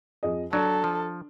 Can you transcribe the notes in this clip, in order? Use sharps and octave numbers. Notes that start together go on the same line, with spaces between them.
F2 G#4 D#5
F#3 D4 A4
F3